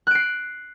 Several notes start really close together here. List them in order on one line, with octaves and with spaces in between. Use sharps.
F#6 D7 C7